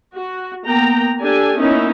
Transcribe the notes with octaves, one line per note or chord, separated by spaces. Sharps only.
F#4
A#3 B3 G5 A#5
D4 G4 A4 G#5
A#3 B3 C#4 D#4 E4